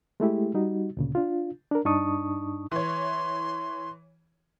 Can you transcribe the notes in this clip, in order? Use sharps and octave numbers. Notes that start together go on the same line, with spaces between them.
G#3 A3 E4 G4
G3 D#4 F#4
D2 A#2 C#3
D4 F4
D4 A#4
G2 D4 D#4 A5 C#6 D#6
E3 C#5 C6